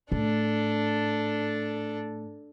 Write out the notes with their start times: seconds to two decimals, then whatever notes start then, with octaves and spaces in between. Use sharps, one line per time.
0.12 A2 D4 A4